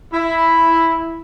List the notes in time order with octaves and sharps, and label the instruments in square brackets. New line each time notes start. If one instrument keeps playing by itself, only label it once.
[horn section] E4